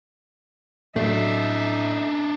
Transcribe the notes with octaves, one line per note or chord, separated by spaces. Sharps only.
A2 F#3 A3 D4 D#4 E5